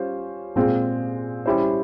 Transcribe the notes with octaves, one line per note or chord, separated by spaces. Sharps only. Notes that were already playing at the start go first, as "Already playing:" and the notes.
Already playing: G3 C#4 F4 C5
A#2 G#3 C4 F4
G3 C#4 E4 G4 C5